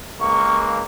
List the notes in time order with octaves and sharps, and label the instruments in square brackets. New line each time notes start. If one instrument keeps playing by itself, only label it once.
[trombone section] C#2 A#3 [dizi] C#6